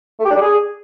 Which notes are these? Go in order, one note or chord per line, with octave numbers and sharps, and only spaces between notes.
A3
G4
D4
G3
G#4